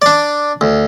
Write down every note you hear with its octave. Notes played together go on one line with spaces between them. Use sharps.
D4 D5
D2